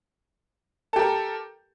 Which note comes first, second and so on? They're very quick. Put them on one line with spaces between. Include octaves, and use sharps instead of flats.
A4 G4 A#4